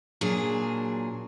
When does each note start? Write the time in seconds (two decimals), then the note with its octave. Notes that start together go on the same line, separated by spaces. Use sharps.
0.21 A#2 F#3 D4 G#4